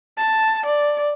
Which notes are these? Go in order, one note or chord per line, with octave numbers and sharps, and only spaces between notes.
A5
D5